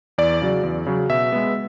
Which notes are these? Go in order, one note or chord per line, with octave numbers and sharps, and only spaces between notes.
E2 D5
C#3 F#3
E2
C#3 F#3
B2 E5
G#3 B3